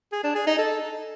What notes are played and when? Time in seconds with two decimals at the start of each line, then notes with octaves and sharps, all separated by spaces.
0.12 G#4
0.24 D4
0.35 G#4
0.47 D#4
0.58 A4